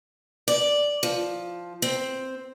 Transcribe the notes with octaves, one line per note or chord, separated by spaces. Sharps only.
D5
F3
C4